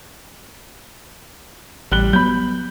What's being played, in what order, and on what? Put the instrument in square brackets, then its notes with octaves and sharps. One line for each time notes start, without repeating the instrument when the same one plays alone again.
[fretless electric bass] A1 [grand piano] G3 F#6 G7
[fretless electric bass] F#3 B3 [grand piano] B5 G6